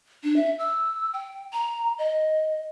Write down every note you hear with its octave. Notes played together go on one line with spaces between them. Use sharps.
D4
E5
E6
G5
A#5
D#5